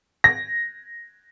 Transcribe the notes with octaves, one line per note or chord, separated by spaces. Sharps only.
A#6